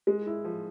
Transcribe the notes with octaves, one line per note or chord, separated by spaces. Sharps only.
G#3
E4
F3